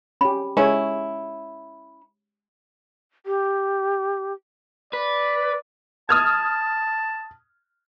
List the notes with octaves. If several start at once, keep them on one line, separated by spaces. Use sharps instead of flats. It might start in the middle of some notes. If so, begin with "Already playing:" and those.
C#4 G4 B5
G#3 C#4 E4 C#5
G4
B4 D5
A5 D#6 F6 G#6